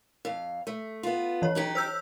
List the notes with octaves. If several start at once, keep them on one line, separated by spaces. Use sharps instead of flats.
F2 F5
A3
B3 F4
E3 C#5
F#3 D#4 G4
C5 E6 G6